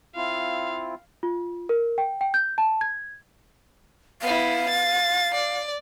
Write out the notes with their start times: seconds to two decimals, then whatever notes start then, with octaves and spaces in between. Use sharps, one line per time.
0.16 C4 E4 F4 F5
1.23 F4
1.69 A#4
1.98 G5
2.21 G5
2.34 G6
2.58 A5
2.81 G#6
4.22 B3 E4 F5
4.69 A6
5.34 D5